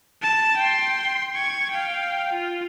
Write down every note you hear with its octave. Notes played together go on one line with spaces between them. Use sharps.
A5
G5 C6
C#6 G#6
F5 G5
F4